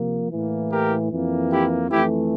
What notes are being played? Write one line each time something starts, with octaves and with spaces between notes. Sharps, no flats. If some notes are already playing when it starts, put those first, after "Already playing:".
Already playing: C3 F3 A#3
A2 E3 A#3
G4 A#4
F2 E3 A#3
E4 G4
F2 E3 A3 E4 G4